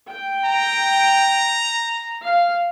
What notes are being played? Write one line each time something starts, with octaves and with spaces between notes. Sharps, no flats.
G5
A#5
F5